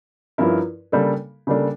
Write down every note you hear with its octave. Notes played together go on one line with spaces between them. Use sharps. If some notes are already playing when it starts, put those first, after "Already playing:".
G2 F3 C#4 E4 A#4
C#3 G3 A#3 D4 A4
C#3 G3 A#3 D4 A4